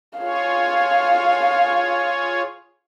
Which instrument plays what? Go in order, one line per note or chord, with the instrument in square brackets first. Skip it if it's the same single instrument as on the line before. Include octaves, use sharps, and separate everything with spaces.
[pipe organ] F4 G#4 C#5 [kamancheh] F5